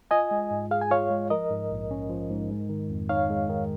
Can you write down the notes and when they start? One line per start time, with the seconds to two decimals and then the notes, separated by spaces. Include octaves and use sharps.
0.11 F4 D#5 G#5
0.31 G#3
0.51 G#2
0.71 G#4 F5
0.81 G#5
0.90 F4 C#5 F5
1.10 G#3
1.30 F3 A#4 D#5
1.50 G#2
1.71 A#1
1.91 C#4
2.10 F3
2.30 G#2
2.50 G#3
2.69 D#3
2.90 F2
3.09 D#4 C#5 F5
3.30 G#3
3.49 D#3